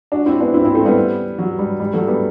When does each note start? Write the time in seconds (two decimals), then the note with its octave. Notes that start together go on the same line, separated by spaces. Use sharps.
0.12 D4 F#4
0.26 C4 E4
0.40 B3 D4
0.54 C4 E4
0.64 C4 E4
0.75 A3 C4
0.85 G3 B3
1.38 F#3
1.59 G3
1.80 G3
1.94 F#3 A3
2.07 G3 B3